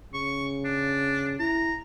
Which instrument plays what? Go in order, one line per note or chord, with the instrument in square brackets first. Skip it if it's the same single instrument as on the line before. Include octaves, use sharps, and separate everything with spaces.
[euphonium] C#3 [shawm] C#6
[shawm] D4
[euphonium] E4 [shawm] A#5